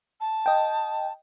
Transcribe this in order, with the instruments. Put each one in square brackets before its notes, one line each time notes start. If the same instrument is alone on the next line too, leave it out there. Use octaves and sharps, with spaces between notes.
[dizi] A5
[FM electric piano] D#5 G5